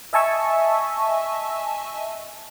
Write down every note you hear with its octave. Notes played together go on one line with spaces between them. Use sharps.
D#5 E5 G#5 A5 C#6 E6